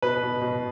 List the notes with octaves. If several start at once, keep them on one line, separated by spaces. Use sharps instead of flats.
B2 B4
B2
B2